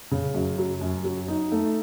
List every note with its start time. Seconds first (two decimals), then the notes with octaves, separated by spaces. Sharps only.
0.11 C#3
0.34 F#2
0.58 F#3
0.81 F#2
1.04 F#3
1.28 D#4
1.52 A3